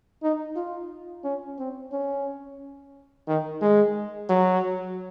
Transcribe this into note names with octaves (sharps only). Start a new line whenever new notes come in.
D#4
F4
C#4
C4
C#4
D#3
G#3
F#3